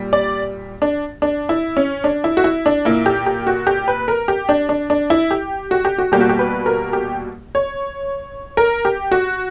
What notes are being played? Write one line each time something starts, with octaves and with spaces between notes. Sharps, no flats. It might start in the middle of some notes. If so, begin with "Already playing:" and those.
Already playing: A#2 G3
D5
D4
D4
E4
C#4
D4
E4
F#4
E4
D4
A#2 A#3 E4
G4
G4
F#4
G4
B4
A#4
G4
D4
D4
D4
E4
G4
F#4
G4
F#4
B2 G3 A#3 G4
F#4
G4
B4
A#4
G4
C#5
A#4
G4
F#4